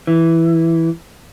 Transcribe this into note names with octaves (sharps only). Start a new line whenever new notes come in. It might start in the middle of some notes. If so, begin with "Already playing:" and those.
E3